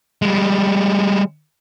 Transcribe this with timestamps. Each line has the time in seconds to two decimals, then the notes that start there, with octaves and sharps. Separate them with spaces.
0.22 G3 G#3